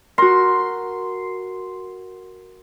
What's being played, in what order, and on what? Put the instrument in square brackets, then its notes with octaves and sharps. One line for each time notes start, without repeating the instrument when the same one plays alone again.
[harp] F#4 A#4 [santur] C6